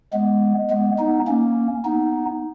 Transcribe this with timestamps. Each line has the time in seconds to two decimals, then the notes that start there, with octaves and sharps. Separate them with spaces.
0.13 G#3 B3
0.70 G#3 B3
0.98 B3 D#4
1.28 A#3 C#4
1.85 B3 D#4